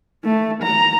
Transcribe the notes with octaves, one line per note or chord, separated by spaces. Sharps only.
A3
A#5